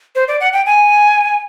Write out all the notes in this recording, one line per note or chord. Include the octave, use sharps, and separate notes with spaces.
C5
D5
F#5
G5
G#5